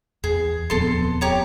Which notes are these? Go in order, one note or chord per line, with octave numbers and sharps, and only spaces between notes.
E2 G#4
D#1 F2 B3 A4 C6
G4 C#5 A#5